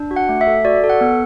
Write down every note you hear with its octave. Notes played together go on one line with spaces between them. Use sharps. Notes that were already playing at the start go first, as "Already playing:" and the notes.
Already playing: D4
F#4
F#5
A3
E5
A4
F#4 D5
A4
F#5
B3